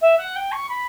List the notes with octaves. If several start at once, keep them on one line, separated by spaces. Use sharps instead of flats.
E5
F#5
G5
C#6
B5